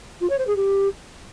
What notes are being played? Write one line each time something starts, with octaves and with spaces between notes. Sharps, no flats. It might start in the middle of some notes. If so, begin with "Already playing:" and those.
F4
C#5
C5
G#4
G4